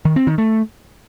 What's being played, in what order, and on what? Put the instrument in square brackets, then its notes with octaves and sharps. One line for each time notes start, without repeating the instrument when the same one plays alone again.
[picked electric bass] D#3
C4
D#3
A3